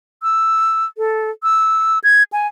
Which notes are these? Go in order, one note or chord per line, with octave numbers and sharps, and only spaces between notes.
E6
A4
E6
G#6
G#5